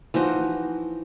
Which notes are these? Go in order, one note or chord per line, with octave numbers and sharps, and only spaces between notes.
E3 F3 D#4 F#4